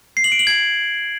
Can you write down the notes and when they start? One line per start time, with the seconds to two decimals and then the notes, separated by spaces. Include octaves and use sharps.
0.17 C7
0.24 F#7
0.32 D7
0.39 F#7
0.47 G#6